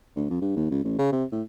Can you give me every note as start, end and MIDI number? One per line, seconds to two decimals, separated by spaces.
0.16 0.27 38
0.30 0.40 41
0.41 0.56 43
0.57 0.66 39
0.71 0.81 37
0.84 0.97 33
0.99 1.12 49
1.13 1.24 48
1.32 1.43 45